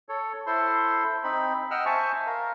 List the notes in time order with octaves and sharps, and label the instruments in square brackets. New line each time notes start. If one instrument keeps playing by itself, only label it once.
[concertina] A4 C#5
E4 A4 C5 C6
C4 D#4 B5
D#5 F#5 G5 E6 F6
C5 E5 G#5 A5 C#6
A#4 F5